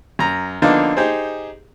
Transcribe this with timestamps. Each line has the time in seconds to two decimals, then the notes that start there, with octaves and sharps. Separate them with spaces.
0.19 F#2 A#5
0.62 D3 F3 A#3 B3 D4 D#4
0.97 D#4 G4 G#4 C5